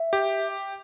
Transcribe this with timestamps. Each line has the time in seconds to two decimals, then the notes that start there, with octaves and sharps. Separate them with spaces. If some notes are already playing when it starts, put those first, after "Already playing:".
Already playing: E5
0.13 G4